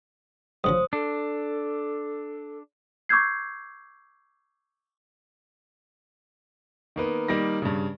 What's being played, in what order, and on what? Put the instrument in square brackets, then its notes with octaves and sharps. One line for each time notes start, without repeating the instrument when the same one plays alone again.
[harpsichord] G2 C#3 F3 [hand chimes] C5 D#6
[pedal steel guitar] D4 [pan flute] A4
[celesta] C#6 D6 E6 G6 G#6 C7
[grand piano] D#3 A#3 B3
D#3 G3 A#3 D#4 A#6
G2 C#3